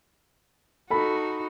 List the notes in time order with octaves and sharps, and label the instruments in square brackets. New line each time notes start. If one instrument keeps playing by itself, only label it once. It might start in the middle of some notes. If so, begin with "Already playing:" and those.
[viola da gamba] D#4 F#4 [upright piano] A4 B5